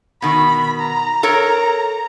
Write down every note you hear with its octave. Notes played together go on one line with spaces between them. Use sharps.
B2 D#3 B5
A#5
A4 A#4 C#5